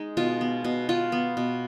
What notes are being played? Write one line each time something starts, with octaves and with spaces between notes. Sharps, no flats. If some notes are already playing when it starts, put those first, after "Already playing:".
Already playing: G#3 D#4
B2 F4
B3
B2
B2 F4
B3
B2